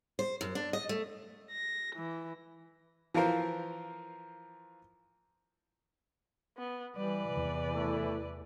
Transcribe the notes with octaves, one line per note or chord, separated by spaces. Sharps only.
C5
F#2
D4
D#5
A3
A#6
E3
E3 F3 F4 A#4 C5
B3
E3 G3 B4 D5
E2 C3
A3 E4